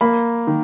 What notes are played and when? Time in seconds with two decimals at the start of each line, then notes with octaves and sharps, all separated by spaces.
0.01 A#3 B5
0.47 D#3